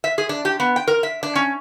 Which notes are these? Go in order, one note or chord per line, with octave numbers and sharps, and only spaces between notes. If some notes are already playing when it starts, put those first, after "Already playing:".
E5
G#4
D4
G4
B3
G5
A#4
E5
D4
C#4